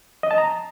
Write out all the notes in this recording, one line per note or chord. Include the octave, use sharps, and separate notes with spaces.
D#5
A5
A#5